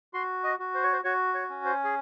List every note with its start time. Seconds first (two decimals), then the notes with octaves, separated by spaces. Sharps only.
0.14 F#4 C6
0.44 D#5
0.59 F#4
0.74 C5
0.84 C#5
0.93 C5
1.04 F#4 C#5
1.34 C#5
1.49 C#4
1.65 C5
1.84 G#4